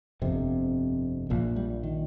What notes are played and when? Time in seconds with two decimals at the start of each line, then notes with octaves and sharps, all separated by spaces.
0.22 G1 F2 C3
1.30 A#1 A#2 F3
1.56 G3
1.83 D#3